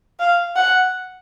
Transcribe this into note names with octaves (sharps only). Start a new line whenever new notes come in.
F5
F#5